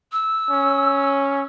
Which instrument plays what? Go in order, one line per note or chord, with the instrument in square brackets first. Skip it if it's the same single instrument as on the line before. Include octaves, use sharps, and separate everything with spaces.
[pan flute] E6
[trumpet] C#4